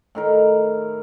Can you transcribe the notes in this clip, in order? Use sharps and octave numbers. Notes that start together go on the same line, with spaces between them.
A2 D#3 A#4